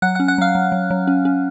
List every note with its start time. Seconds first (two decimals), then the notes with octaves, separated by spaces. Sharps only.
0.02 F#3 F#5 F#6
0.15 F#5 F#6
0.20 C#4
0.28 F#5 F#6
0.38 F#3 F5 F6
0.55 F#3
0.72 F#3
0.90 F#3
1.07 C#4
1.25 C#4